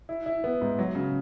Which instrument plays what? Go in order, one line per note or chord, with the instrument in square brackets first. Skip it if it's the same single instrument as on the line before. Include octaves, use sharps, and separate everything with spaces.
[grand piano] E4
E4
B3
G#2
F#3
C#3